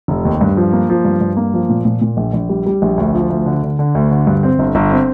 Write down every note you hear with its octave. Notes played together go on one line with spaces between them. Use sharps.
F1
D#2
G2
F3
A#3
F3
G2
G2
A#3
F3
A#2
A#2
A#2
A#1
A#1
G3
G3
A#1
D2
F3
D2
D3
D3
D3
D2
D3
G2
C4
G1
G1
C4